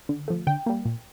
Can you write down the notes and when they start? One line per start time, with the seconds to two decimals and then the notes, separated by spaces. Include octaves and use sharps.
0.09 D3
0.28 F3 A3
0.47 D3 G5
0.66 G3 A#3
0.85 A#2